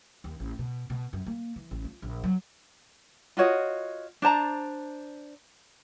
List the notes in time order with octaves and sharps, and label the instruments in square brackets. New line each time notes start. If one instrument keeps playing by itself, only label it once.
[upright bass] D#2
A1
B2
B2
F#2
A#3
E3
A1
F4
A#1
F#3
[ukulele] F4 F#4 C#5 D#5
D4 C5 A5 A#5